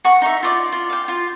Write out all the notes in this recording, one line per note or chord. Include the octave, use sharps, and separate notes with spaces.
F#5 C#6
D#4 E5
F4 D5
F4
F5 G5
F4